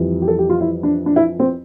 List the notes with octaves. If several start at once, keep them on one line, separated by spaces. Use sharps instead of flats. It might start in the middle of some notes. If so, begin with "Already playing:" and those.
Already playing: F2 E3 G3
G4
A4
G4
F4
E4
D4
D4
E4
C4